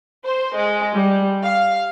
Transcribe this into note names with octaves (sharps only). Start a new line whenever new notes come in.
C5
G#3
G3
F5